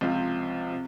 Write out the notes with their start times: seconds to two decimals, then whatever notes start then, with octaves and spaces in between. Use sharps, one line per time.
0.01 C#2 C3 F3 C4 F4
0.71 C3